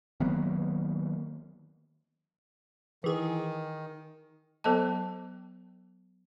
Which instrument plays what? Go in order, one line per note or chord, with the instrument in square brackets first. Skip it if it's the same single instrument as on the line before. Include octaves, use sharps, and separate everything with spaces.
[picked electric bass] D#3 F#3 A#3 B3
[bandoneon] D#3 [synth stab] E3 G#4
[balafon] F#3 B3 A4 C5 D#5 A5